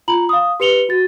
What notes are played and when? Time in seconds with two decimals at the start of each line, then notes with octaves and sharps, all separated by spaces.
0.08 F4 A#5 B5 F#7
0.29 F5 D#6
0.60 G4 B4 C#7 F7 G7
0.89 F#4 A6